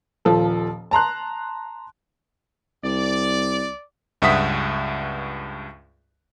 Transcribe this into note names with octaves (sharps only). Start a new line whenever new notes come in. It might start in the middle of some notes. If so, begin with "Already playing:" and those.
D#1 F3 A4
A5 A#5 C6 F#6
C2 D5
C#2 G2 E5 F#5 D#6 B6